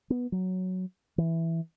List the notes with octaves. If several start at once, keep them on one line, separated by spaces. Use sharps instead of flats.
B3
F#3
E3